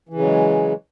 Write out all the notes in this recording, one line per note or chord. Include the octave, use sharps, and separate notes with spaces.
C#3 E3 F#3 G#3